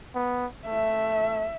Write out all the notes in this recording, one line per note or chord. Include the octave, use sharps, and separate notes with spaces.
B3
A3 E5